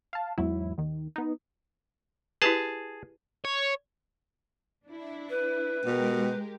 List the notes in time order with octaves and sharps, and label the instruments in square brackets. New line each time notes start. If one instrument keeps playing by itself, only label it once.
[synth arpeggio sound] F5 A5
E2 G#2 F#3 E4
D#2 D#3
B3 D#4
[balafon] E4 G4 B4 [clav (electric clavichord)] G#4 A5
[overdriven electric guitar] C#5
[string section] D4 E4
[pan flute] B4
[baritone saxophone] B2 [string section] G#3 G4 A#4